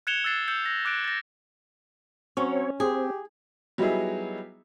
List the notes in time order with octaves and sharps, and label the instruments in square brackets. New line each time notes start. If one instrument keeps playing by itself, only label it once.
[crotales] F#6 G#6 C#7 E7 F7 G7
E6 F#6 A6 C7 E7
E6 G6 C#7
A#6
D6 F#6 A6 D7
A6 A#6
[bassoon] F#3 [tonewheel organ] C4 C#5 [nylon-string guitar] C#4
[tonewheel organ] C4 [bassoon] G4 [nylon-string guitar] G#4
[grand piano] F#3 G3 B3 D#4 E4 G#4